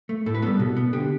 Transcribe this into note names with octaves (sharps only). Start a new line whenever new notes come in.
A3
A2 A4
B4
G3 B3 A4
B2
B3
D3 G4